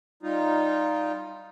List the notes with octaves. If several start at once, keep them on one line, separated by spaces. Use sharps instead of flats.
G3 D#4 F4